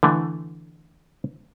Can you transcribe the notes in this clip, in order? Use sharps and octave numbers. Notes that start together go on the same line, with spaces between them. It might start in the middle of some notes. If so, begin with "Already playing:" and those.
D3 E3 A3